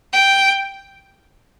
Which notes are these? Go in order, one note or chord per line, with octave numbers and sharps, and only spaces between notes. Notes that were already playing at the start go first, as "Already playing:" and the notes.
G5